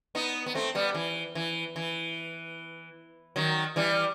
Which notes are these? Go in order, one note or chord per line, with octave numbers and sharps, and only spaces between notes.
B3 D#4
B3
A3 C4
G3 B3
E3
E3
E3
D#3 F#3
E3 G3